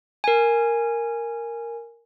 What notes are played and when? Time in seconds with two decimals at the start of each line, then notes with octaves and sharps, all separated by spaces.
0.24 A#4 G#5